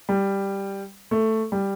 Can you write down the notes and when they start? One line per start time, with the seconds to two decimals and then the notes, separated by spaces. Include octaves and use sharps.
0.09 G3
1.11 A3
1.52 G3